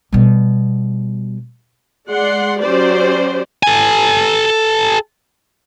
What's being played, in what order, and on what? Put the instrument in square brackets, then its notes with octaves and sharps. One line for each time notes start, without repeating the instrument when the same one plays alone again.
[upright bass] B2 G3
[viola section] G#3 D5 F#5 C6
F#3 C#4 G4 C5 D5
[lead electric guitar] A4 G#5